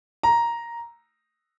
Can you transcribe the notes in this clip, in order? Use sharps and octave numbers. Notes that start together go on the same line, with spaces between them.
A#5